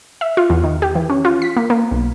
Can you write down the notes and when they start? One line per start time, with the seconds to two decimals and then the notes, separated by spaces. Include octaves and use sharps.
0.21 E5
0.37 F4
0.50 E2
0.64 D#3
0.82 G4
0.95 E3
1.10 C#4
1.25 F4
1.42 B6
1.57 A#3
1.70 A#3
1.91 B1